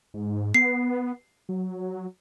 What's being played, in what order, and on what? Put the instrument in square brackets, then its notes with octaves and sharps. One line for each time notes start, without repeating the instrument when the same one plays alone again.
[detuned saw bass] G#2
[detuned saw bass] B3 [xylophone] C7
[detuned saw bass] F#3